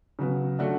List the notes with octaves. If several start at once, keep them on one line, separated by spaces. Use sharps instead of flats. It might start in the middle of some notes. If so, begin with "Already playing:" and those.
C#3 F#3 B3
F#3 A3 D4 F#4